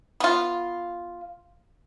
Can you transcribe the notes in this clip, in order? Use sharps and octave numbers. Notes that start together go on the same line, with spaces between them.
B3 F4